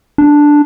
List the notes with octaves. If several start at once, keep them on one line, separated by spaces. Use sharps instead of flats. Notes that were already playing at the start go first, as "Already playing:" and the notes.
D4